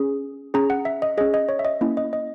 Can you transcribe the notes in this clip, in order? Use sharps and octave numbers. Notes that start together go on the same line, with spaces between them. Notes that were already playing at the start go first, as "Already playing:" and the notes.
Already playing: C#4 G#4
C#4 G#4 A#5
F#5
E5
D#5
C#4 G#4 D#5
D#5
C#5
E5
D#5
A#3 C#4 E4
D#5
D#5